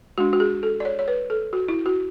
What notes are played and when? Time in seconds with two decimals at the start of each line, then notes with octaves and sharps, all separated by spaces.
0.18 G#3 D4 F#4
0.33 F#4
0.40 G#4
0.63 A4
0.80 D5
0.85 C#5
0.99 C#5
1.08 B4
1.30 A4
1.53 F#4
1.68 E4
1.86 F#4